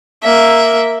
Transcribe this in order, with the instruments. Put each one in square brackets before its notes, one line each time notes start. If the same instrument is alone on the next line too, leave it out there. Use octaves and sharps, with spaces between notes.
[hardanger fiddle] A#3 E5